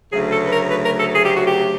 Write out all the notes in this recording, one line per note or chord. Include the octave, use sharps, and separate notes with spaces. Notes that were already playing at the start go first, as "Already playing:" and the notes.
D2 C#3 F#3 A3 G#4
A4
B4
A#4
B4
A#4
A4
G#4
G4
F#4
G4